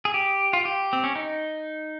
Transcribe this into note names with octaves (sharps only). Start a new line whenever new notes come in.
G#4
G4
F4
G4
C4
C#4
D#4